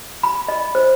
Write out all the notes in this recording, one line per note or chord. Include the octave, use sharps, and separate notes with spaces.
B5
D#5
C5